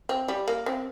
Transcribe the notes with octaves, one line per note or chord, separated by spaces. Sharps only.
C4
G3
A#3
C4